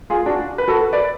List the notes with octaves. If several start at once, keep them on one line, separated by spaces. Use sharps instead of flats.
F4 G#4
D4 F#4
B4
F#4 A4
B4 D5